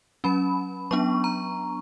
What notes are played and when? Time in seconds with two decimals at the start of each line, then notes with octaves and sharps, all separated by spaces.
0.24 F#3 C#4 B5
0.91 F#3 B3 D4 C#6
1.24 A#5